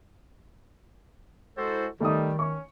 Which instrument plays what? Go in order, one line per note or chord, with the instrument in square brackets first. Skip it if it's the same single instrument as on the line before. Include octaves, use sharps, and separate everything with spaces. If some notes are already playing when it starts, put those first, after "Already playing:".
[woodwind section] G#3 E4 A4 [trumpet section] F#4 C5
[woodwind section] D#3 [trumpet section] G3 [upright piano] A3 D#4 D#6
[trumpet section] C#4 [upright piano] C#6